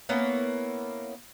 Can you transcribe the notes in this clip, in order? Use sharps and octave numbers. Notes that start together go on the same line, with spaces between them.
A#3 B3 C#4 E4